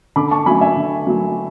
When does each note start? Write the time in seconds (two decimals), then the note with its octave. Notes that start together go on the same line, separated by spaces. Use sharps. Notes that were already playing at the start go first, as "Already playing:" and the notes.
0.16 D3 B5 D6
0.31 A5 C#6
0.46 F#3 A3 G#5 B5
0.61 E5 G#5
0.76 D3
1.07 F#3 A3